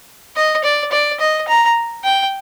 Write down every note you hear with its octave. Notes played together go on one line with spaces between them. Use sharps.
D#5
D5
D5
D#5
A#5
G5